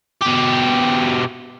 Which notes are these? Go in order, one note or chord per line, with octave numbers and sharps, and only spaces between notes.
B2 G4